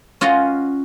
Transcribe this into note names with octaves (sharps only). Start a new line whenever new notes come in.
C#4 F4 F#4 D#5 F5